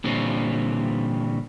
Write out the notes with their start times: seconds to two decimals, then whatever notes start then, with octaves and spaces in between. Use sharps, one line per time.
0.04 A#2 D3 E3 G3 C4 C#4